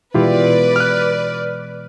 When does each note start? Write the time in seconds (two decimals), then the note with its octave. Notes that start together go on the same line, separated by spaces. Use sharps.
0.14 B2 E3 G#3 E4 F4 G4 B4 D5
0.76 F6 F#6